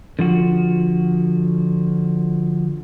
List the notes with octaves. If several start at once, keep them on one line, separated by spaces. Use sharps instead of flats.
D3 F3 F#4